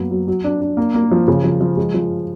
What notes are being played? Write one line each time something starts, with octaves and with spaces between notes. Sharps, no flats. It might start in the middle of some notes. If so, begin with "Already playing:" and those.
Already playing: F#2 A#3 B3
F#3
F#3
D4
D4
A#3
A#3
F3
C#3
F3
F3
G#3
F3